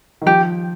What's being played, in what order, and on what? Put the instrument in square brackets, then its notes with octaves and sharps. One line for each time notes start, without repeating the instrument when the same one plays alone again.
[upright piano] D#3
[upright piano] F3 [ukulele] G4